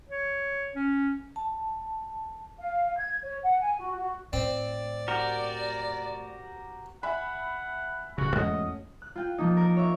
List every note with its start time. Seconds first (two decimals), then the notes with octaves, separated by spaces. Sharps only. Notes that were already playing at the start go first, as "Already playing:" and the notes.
0.09 C#5
0.75 C#4
1.36 A5
2.59 F5
2.98 G#6
3.23 C#5
3.43 F#5
3.60 G#5
3.78 F#4
3.96 F#4
4.33 A2 C4 D5
5.08 F#4 G4 A#4
7.03 E5 F#5 G#5 B5
8.18 D1 C#3 F#4
8.35 E2 G#2 G#3 A3 C#4 F#4 D#5
9.02 F#6
9.16 F4 G5
9.38 F3 A#3 D#4
9.57 A#4
9.76 C#5 E5